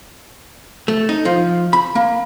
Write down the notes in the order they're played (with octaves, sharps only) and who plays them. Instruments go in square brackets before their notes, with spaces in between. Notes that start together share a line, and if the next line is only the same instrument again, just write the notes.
[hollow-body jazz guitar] A3
D#4
F3
B5
A#3